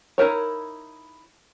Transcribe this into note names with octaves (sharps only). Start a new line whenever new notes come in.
D#4 E4 A#4 C#5